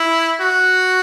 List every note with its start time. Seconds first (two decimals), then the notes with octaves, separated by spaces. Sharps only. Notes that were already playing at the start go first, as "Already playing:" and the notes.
Already playing: E4
0.40 F#4